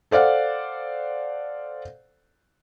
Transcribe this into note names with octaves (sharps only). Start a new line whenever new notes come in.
A4 C5 D5 F5 F#5